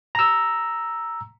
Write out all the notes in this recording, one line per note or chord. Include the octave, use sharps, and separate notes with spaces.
A#5 E6